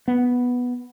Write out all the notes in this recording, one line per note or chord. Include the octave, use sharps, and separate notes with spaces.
B3